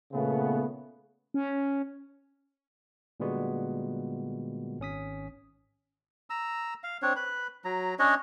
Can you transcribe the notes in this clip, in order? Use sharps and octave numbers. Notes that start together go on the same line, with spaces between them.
A#2 C#3 A3 B3
C#4
A#2 D3 G3 G#3 B3 F#4
G#1 C#4 D#6 B6
A#5 E6
F5
C4 D4 C#5
B4 B5
F#3 A#5
C#4 D4 C#5 D#5